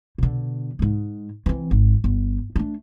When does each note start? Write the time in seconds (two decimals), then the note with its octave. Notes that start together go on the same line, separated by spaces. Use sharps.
0.18 B2 D3
0.79 G#2 G#3
1.46 E3 C4
1.71 G#1
2.04 G1
2.56 A3 D4